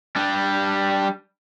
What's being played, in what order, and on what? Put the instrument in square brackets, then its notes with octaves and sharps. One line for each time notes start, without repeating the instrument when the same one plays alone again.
[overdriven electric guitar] G3 D4